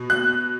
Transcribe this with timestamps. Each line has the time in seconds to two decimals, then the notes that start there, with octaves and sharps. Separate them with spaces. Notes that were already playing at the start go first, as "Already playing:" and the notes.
Already playing: B2
0.10 F#6